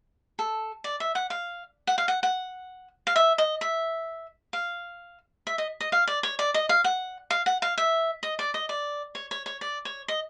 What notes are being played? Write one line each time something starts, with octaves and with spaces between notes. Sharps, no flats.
A4
D5
E5
F#5
F5
F#5
F5
F#5
F#5
F5
E5
D#5
E5
F5
E5
D#5
D#5
F5
D5
C#5
D5
D#5
F5
F#5
F5
F#5
F5
E5
D#5
D5
D#5
D5
C#5
C#5
C#5
D5
C#5
D#5